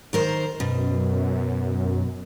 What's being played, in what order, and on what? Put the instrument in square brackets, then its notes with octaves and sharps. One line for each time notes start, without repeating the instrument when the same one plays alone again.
[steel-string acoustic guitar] D#3 A#4 C5
[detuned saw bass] F#2 [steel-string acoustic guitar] B2